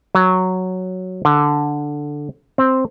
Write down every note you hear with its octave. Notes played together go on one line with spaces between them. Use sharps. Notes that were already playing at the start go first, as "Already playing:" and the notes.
F#3
D3
C4